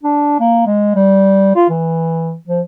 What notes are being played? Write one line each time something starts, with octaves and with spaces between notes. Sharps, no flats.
D4
A#3
G#3
G3
F4
E3
F3